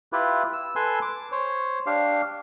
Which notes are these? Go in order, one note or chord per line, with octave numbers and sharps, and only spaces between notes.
E4 F4 G4 B4
E6
A4 B4 G#5 C6 E6
D6
C5 C#5
D4 G4 F5